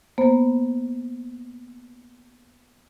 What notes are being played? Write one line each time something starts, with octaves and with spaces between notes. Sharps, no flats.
A#3 B3 C5